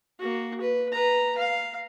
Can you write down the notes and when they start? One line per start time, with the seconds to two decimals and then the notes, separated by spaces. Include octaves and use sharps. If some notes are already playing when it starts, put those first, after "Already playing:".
0.19 A#3 F#4
0.61 B4
0.92 B4 A#5
1.37 F5